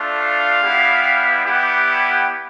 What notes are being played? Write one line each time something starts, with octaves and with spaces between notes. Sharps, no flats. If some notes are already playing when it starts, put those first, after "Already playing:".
Already playing: A3 D4 F4
F5
G3 B3 E4 G4
G3 B3 E4 G4 F#5